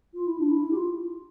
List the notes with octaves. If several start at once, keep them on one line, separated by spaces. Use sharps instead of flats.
F4
E4
D4
E4
G4
F4